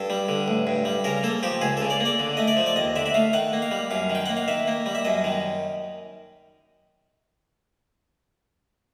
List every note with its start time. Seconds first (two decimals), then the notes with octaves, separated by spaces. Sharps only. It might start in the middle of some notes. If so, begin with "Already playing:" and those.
Already playing: G2 A4
0.10 G3
0.28 D3
0.48 A1
0.67 G2
0.85 G3
1.04 C#3 A#4
1.23 A#3 A4
1.43 F3 G4
1.61 C#2 G#4
1.77 C#3 A4
1.90 D5
2.00 A#3
2.05 D5
2.20 D3
2.37 A3 D#5
2.48 D5
2.57 F3
2.66 D5
2.76 D#2 D#5
2.96 D3 E5
3.06 E5
3.14 A3 F5
3.33 D#3 F#5
3.53 A#3
3.62 F5
3.71 G3
3.91 F#2 F5
4.10 D#3
4.15 G5
4.26 A#3 F#5
4.37 F5
4.48 D#3 E5
4.67 A#3
4.86 G3
4.95 E5
5.05 F#2 D#5
5.24 D#3